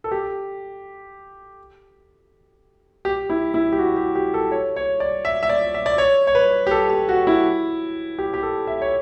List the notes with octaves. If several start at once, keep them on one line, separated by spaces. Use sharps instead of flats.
A4
G4
G4
E4
E4
G4
F#4
G4
G4
A4
C#5
C#5
D5
E5
E5
D5
E5
D5
C#5
C#5
B4
G4
A4
G4
F#4
E4
G4
G4
A4
E5
C#5